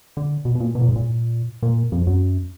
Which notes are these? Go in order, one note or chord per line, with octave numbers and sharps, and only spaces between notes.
D3
B2
B2
A#2
B2
A#2
G#2
A#2
A#2
F2
F#2